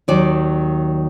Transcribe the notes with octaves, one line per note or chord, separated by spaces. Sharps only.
D#2 D#3 F#3 D5